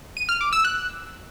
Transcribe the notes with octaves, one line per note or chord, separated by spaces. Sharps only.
D#7
F6
D6
E6
F#6